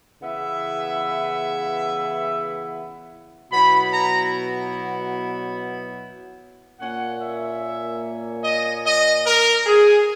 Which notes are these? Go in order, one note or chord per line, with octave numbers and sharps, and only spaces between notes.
C#3 E3 B3 E4 E5
B2 F#3 B3 E4 B5
A#5
A#2 A#3 C#4 F#5
E5
D#5
D#5
A#4
G#4